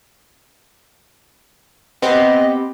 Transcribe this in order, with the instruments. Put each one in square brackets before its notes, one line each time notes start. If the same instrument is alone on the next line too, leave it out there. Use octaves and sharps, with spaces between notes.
[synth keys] B3 C4 G4 [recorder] D#5